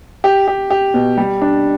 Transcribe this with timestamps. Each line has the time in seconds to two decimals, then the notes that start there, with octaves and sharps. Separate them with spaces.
0.24 G4
0.48 G4
0.70 G4
0.94 B2
1.17 G3
1.41 D4